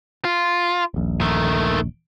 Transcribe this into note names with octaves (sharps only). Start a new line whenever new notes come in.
F4
D#1 A#1
D#3 A3